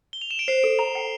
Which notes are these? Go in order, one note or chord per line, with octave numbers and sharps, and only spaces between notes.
G7
F7
E7
D7
C5 C7
A4 D7
A#5 F7
G5